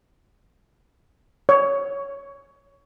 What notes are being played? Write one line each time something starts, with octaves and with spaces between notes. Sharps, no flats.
C#5